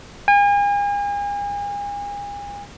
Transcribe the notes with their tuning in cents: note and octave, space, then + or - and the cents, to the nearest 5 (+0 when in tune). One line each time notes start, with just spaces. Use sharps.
G#5 -40